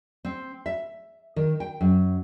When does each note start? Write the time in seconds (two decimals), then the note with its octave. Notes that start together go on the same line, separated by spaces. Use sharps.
0.25 C4
0.66 E5
1.36 D#3
1.60 G5
1.81 F#2